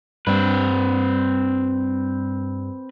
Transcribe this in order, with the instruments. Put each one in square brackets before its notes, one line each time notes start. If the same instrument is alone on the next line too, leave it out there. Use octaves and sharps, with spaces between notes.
[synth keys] G2 G3 [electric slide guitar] C4 B4